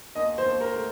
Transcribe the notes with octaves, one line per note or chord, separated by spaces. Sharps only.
D#2 D#5
C5
D#2
A#4
A3